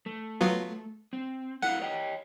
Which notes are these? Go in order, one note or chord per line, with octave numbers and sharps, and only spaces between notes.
A3
F#3 B3 F4
C4
A3 E4 F5 F#5
C#5 D#5 G5